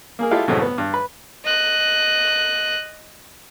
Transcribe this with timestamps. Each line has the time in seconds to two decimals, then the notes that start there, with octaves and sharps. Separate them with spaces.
0.19 A#3 G#4 A#4
0.31 G#3 E4 F4 G4 A4
0.47 C2 F#2 A2 G#3 A3
0.62 B3
0.78 G2
0.94 B4
1.45 D#5 F#6